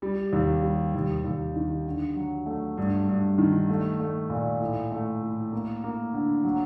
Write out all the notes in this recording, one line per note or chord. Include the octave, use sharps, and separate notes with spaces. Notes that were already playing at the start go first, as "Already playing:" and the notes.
G3
D#2
G3
D#2
D#2
D#3
D3
F#3
A3
G2
G2
D#3
A3
A3
A#2
A2
A3
A2
A#3
A#3
D3
F#3